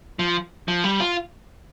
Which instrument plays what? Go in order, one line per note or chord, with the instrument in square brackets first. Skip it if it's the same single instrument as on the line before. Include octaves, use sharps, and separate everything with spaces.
[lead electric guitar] F3
F3
G3
F4